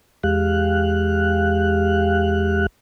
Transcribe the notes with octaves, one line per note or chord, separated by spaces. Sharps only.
E2 G#3 G4 F5 F#6